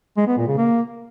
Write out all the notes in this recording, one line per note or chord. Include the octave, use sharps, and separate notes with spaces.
G#3
B3
A#2
C#3
A#3